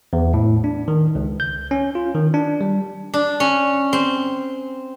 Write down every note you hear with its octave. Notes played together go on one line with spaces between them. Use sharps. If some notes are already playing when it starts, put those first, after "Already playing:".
E2
A2
D4
D#3
C#2
G6
C#4
F4
D#3
D4
G3
D4
C#4
C4